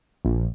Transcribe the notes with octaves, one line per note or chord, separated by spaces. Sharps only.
A#1